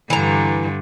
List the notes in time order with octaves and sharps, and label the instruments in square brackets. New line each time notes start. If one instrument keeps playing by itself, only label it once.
[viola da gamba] G2 D3 [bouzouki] E3 A#5